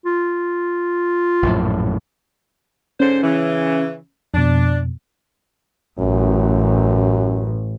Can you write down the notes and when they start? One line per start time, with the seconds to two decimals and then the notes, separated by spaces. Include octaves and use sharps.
0.06 F4
1.43 A#1 F#2 A2
3.00 G#2 D3 C#4 C5
3.23 C#3 E3
4.34 F2 B2 D4
5.99 A1 F#2